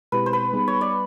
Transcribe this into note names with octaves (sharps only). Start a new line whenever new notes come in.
B2 G#3 C4 E4 G4 B4
C5
B4
G3 B3 D#4 G#4
C#5
D5